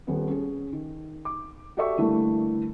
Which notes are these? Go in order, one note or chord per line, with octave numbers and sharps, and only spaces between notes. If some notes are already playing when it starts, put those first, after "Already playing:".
D#1 B3
C#4 G#4
D#3
D6
F#4 G4 A4 D5 E5 C#6
D3 E3 G3 A3 A#3